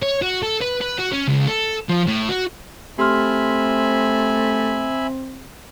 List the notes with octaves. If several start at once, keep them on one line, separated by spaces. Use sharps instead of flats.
C#5
F#4
A4
B4
B4
F#4
C#4
C#2
A4
F3
A2
F#4
A3 C4 G4 E5 G#5 B5 C6 F6